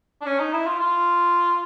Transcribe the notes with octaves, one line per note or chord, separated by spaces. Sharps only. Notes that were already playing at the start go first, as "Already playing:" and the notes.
D4
C#4
D#4
E4
F4
F4